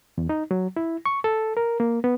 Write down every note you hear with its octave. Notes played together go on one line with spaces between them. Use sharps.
E2
D#4
F#3
E4
C#6
A4
A#4
A#3
B3